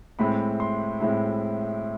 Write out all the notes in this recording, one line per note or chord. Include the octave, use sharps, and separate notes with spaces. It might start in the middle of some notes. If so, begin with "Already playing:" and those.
A2 G#3 C4 E4 B5
C6
A2 G#3 C4 E4